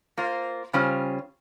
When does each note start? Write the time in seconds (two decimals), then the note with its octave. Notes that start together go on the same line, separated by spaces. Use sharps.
0.17 A#3 F4 C5
0.73 C#3 G3 C#4 F4 C5